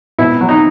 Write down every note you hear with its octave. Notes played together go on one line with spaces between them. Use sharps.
B2 E4
F#3
D#4